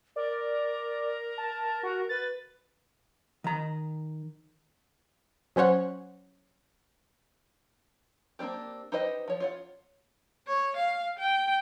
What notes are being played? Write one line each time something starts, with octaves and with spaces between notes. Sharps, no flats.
A#4 D5
A5
F#4
B4 A6
D#3 A#5
F#3 C#4 C5 C#5 F#5
A#3 C4 D4 G4
D#4 G4 B4 C5 D#5
F3 F4 C#5
F4 C#5 F#5
C#5
F5
G5